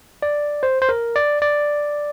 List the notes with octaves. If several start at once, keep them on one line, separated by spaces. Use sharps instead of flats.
D5
C5
C5
A#4
D5
D5